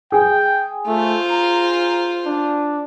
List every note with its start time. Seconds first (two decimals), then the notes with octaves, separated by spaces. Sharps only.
0.12 G#4 G5
0.87 A3 F4 C5
1.31 A#5
2.26 D4